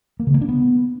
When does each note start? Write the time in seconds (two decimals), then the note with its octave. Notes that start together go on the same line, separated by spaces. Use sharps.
0.20 A#3
0.27 C#3
0.34 A#3
0.41 D4
0.49 B3